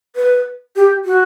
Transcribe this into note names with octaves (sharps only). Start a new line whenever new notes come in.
B4
G4
F#4